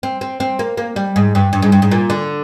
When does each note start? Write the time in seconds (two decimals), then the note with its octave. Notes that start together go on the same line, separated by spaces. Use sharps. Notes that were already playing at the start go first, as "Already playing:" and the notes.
0.03 C4
0.21 C4
0.40 C4
0.59 A#3
0.77 A#3
0.96 G3
1.16 G#2
1.35 G2
1.53 G2
1.62 G#2
1.72 G2
1.82 G#2
1.91 A#2
2.10 D3